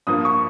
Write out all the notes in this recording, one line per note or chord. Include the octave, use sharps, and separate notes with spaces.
G2 F3 A#3 D#6
C#6